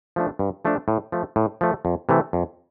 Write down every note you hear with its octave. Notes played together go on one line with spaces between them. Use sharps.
F3 A3 D4
G2
F3 A3 D4
A2
F3 A3
A2
F3 A3
F2
C3 E3 A3
F2